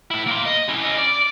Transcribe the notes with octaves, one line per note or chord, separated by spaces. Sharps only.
A2 E4
A#3 C6
D#5
C#4 E4
C#4 D#5
D5